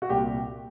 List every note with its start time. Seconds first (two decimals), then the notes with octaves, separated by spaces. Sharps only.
0.02 F#4
0.09 C2 A#2 G3 G4